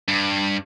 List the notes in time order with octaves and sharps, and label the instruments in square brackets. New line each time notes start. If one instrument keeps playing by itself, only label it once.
[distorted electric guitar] G2